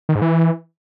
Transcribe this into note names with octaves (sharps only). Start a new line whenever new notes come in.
D#3
G#2
E3